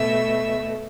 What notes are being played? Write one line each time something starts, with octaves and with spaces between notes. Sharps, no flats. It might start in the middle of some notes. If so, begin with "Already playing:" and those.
Already playing: B2 A3 E5